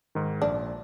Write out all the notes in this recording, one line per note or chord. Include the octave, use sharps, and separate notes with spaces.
G#2 D#3
A#1 D4